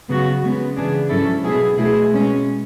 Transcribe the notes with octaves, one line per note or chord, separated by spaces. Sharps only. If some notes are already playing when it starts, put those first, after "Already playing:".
C#3 F#3 B3 F#4
C#3 G#3 B3
C#3 E3 B3 D4 G#4
G#2 F#3 C#4 E4 A4
B2 F#3 B3 E4 G#4
B2 A3 E4 G#4
B2 G#3 C#4